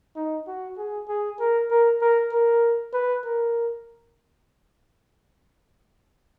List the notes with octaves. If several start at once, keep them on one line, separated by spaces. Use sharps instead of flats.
D#4
F#4
G#4
G#4
A#4
A#4
A#4
A#4
B4
A#4